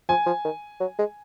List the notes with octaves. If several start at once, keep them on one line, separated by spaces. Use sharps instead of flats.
F3 G#5
F3
D#3
F#3
G#3